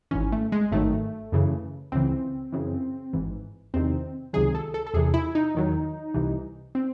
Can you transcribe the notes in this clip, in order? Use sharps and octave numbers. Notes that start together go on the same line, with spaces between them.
G#1 G#2 E3 C#4
A3
G#3
G#1 G#2 D#3 F#3 A3
F#2 C#3 E3
C#2 C#3 E3 C4
F#2 C#3 E3
G#1 G#2 E3
E2 C3 D#3 C4
C#2 C3 D#3 F#3 G#4
A4
A4
A4
E2 C3 E3 G#4
E4
D#4
E2 D#3 F#3
C2 C3 E3
C4